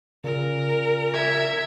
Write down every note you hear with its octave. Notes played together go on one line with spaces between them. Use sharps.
A#2 C#3 A#4
E5 G#6